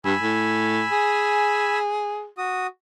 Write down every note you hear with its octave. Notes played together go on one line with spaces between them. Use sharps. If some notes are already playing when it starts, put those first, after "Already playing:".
G2 G#5 B5 E6
A2
G#4
F#4 D#6